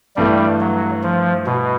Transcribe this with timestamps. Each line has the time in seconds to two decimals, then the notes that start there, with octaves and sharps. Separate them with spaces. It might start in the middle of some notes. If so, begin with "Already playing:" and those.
0.16 G2 E3 G3 A3
0.60 F#3
1.03 F3
1.46 B2